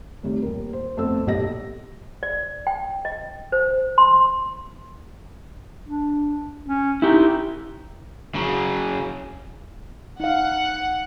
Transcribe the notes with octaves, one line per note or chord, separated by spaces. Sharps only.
A2 C3 D#3 G3
D#1 A#4
C5
F2 A3 B3 C5 E6
B1 A#2 G4 A4 D#5 A#6
D5
G5
D#5
C5
C6
D4
C#4
D#4 E4 G4
C#3 F#3
D#4 F5 F#5